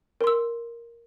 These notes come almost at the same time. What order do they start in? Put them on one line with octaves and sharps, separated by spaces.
A#4 C6 E6